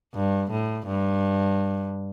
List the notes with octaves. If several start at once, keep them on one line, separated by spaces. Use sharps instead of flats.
G2
A2
G2